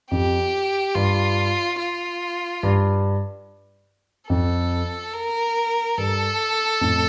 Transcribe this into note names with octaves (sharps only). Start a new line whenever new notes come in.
F2 G4
G2 F4
F4
G2
F2 A4
A#4
G2 A4
F2 A2